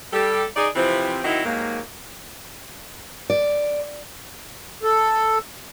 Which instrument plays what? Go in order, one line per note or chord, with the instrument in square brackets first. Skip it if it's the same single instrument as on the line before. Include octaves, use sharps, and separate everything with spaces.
[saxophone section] G3 G4 A4
D#4 G#4 D5
C3 E3 F3 C4
D#3 F#3 C4 D#4 E4 F#4
D#2 G#2 F#3 A#3
[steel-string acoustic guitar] D5
[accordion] A4